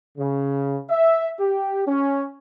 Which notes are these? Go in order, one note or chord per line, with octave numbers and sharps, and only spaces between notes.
C#3
E5
G4
C#4